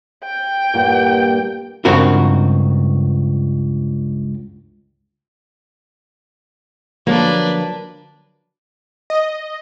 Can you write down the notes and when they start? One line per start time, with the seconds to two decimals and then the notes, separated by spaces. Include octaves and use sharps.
0.24 G5
0.74 G2 A#2 F#5
1.85 C#2 G2 C4 F#4 A#4
7.07 D3 F3 F#3 A#3 D4 B4
9.10 D#5